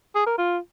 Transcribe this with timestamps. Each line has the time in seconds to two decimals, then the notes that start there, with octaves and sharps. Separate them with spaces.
0.15 G#4
0.26 A#4
0.38 F4